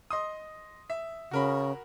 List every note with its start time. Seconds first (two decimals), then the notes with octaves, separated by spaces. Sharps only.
0.11 D#5 C6 D#6
0.90 E5
1.31 C#3 F#4 A#4 B5